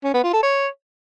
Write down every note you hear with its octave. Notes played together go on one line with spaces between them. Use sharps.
C#4
B3
F4
A4
C#5